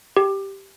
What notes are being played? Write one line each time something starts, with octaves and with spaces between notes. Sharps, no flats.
G4